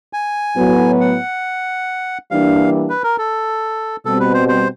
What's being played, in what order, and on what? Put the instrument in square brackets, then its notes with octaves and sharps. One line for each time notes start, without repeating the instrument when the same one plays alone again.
[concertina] G#5
[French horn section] A2 F#3 B3
[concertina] F#5
[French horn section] E3 G3 A#3 D4 [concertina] F5
[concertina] B4
A#4
A4
[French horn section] B2 G3 C4 [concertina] A4
[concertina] B4
C5
C5